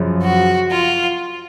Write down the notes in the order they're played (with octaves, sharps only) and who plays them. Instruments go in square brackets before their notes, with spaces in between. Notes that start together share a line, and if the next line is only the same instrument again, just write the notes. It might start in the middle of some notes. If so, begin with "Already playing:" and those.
Already playing: [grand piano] F#2 C#3 F3
[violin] F#4
F4